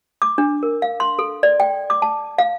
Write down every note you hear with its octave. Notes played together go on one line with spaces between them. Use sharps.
D6
D4
A#4
F5
C6
A4
D5
G5
D6
A5
F5